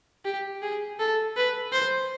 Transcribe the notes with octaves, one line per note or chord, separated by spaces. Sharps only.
G4
G#4
A4
B4
C5